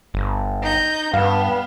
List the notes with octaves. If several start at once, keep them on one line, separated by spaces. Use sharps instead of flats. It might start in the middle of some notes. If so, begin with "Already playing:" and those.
G1
D#4 G6
G2 B3 F5